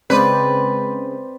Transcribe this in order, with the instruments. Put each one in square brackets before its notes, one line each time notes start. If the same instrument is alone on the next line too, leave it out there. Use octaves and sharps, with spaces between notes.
[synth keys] C#3 G#3 [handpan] C4 C5 D5 [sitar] B4